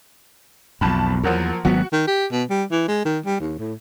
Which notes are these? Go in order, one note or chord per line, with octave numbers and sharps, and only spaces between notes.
B1 F2 A5 B5
E2 F3 F#3 A#3
G#1 F#3 B3 F#4
D#3
G4
B2
G3
E3
G#3
D#3
G3
D#2
A2